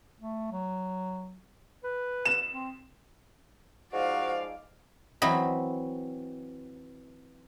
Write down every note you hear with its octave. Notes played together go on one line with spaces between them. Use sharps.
A3
F#3
B4
E7
C4
G#2 F3 F#4 D5 F5
E3 F#3 C4 D#5 B5